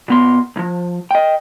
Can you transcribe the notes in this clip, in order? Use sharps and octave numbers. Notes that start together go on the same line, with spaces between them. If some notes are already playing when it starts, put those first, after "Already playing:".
A#2 B3 C6
B1 F3
D#5 G5